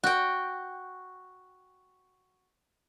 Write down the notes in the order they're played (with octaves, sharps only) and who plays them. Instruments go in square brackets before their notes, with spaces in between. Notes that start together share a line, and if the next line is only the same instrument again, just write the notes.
[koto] F#4 G5